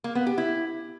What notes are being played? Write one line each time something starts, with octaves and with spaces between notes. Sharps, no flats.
A#3
B3
G4
E4